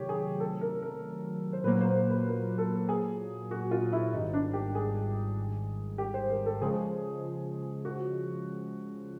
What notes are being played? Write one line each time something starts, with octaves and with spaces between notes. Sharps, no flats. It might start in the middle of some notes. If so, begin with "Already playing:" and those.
Already playing: C3 D#3 F#3 A3 G4 C#5
G#4
A4
A#4
A#4
C5
A#2 F#3 A#3 B4
C5
B4
B4
A#4
A4
G#4
F#4
F4
E4
G#1 G#2 D#3 G3 D#4
D4
G4
G#4
G4
C5
A#4
A4
C#3 F3 G#3 G#4
F#4